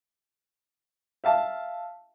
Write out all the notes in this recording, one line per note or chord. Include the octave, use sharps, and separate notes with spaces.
E5 F5 A5